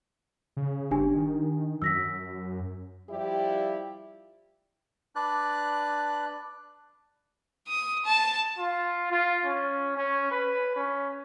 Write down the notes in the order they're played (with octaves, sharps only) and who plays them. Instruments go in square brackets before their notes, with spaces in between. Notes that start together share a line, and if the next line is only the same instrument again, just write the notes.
[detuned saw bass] C#3
[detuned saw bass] G1 [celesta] D4 G4 G#5
[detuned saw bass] D#3
[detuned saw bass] F#2 [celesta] E6 A#6 B6
[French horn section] F3 G3 E4 F4 G4 D5
[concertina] D4 B4 D5 F#6
[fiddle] D#6
A5
[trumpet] F4
F4
C#4
C#4
B4
C#4